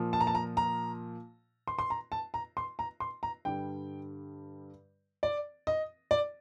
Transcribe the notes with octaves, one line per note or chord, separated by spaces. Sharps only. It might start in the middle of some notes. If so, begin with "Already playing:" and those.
Already playing: A#2 F3
A5
A#5
A5
A#5
A#5
C6
C6
A#5
A5
A#5
C6
A#5
C6
A#5
G2 D3 G3 G5
D5
D#5
D5